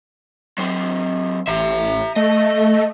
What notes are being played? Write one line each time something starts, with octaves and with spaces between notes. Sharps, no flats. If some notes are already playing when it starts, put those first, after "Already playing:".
F#3 C4
A1 E5 A#5
A3 D#5